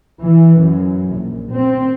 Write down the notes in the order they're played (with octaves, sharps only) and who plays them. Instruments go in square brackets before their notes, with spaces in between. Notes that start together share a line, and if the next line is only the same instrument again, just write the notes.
[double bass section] E3
F#2
A#1
C4